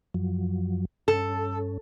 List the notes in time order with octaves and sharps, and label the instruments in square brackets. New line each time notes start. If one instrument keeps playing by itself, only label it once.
[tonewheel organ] F#2 F3 F#3
[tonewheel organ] G2 C#4 [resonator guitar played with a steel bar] A4